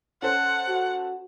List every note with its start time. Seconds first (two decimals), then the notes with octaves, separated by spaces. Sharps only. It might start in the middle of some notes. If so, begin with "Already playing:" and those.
0.22 C#4 A4 C5 F#5
0.69 F#4